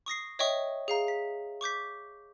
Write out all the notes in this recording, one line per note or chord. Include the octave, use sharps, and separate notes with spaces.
C#6 D#6 A#6 C7
C#5 D#5 E5 G5 C#6 D#6
G#4 F5 A#5
B6
C#6 D6 G6 B6